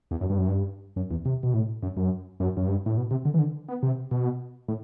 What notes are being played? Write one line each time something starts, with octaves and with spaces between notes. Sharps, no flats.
E2
F#2
G2
F#2
G2
F#2
E2
C3
B2
A2
F#2
F#2
F#2
F#2
G2
A2
B2
C3
D3
E3
D3
B3
C3
B2
A2